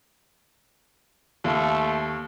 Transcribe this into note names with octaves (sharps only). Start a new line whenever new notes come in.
D#2 A3